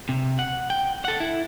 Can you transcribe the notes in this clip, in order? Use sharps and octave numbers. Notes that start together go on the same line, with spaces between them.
C3
F#5
G5
A4 F#5
E4